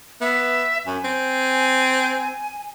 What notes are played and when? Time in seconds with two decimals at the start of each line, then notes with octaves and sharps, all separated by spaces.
0.21 B3 E5
0.86 F#2 G#5
1.05 C4